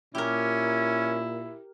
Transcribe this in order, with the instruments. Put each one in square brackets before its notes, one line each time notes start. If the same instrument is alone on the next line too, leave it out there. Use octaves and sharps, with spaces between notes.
[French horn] A#2 [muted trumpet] C#4 [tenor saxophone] E4 [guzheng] G4 A#4